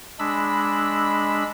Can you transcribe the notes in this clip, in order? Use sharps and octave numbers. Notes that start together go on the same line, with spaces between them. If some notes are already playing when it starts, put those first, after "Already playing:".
G#3 D4 B5 E6